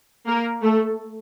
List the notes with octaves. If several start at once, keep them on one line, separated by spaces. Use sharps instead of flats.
A#3 A#4
A3 A4